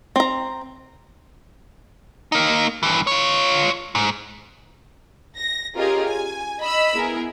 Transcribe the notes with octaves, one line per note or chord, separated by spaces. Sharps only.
C4 A#5
A#3 D#4
G2 E3
F4 C#5
G#2
A#6
C#4 F4 G4 G#4 A#4 D#5
G#5
D#5 B5 E6
B3 E4 G#4 A#4